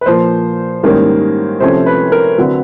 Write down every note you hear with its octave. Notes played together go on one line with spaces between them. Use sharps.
B4
A#2 F3 A#3 C5
G#2 D#3 G3 A#3 C#4
C3 F3 A3 C#4 C5
B4
A#4
D3 F#3 A3 C4 B4